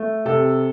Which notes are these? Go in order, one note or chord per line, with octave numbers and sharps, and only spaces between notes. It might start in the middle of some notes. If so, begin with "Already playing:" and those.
Already playing: A3
C3 A4